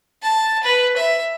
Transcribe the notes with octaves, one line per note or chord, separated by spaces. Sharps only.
A5
B4
E5